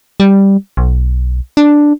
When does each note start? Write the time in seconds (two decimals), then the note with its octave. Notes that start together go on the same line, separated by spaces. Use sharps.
0.20 G3
0.77 B1
1.57 D4